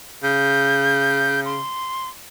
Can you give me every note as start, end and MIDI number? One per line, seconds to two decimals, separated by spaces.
0.23 1.61 49
0.23 1.40 91
1.45 2.08 84